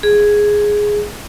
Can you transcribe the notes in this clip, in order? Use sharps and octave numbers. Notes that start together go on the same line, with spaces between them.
G#4